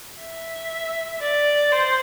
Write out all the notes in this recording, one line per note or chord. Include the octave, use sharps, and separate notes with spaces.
E5
D5
C5